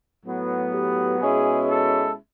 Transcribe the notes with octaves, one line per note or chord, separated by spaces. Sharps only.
A2 F#3 B3
G4
B2 G#3 C#4 E4 G#4
A4